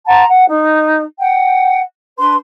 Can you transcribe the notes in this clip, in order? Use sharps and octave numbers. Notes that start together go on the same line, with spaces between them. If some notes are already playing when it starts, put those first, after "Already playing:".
F#5 A5 A#5 C6
F#5
D#4
F#5 G5
D4 B4 C6